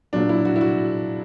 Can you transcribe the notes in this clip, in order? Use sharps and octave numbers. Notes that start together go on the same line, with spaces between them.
A#2 F#3 D4
E4
F#4
E4
F#4